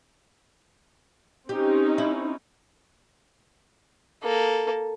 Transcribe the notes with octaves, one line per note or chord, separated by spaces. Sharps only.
C4 C#4 D#4 G4
E4
A#3 A4